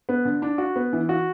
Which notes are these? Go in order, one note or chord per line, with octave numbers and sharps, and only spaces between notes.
B3
D3
D4
F#4
B3
E3
F#4